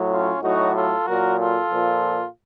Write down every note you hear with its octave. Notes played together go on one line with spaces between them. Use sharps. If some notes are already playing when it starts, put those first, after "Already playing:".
Already playing: A2 F#3
C#4 F4
A2 F#3 D#4 F#4
F4 A4
A#2 F#3 F#4 A#4
F4 A4
A#2 F3